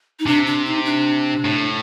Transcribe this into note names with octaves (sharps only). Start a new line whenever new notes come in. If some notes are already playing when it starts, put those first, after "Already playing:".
D#4
C3 D4
D4
D#4
D4
A2